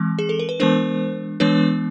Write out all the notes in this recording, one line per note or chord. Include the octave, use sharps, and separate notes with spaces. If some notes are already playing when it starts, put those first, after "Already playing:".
Already playing: E3 G#3 C4
G#4
A4
A#4
B4
E3 G#3 B3 D4 A#4 C5
E3 G#3 B3 D4 B4 C#5